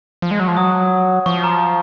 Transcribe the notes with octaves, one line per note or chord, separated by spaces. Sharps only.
F3
G#3
F#3
F3
F#3 D#6
F3 C#6
A#5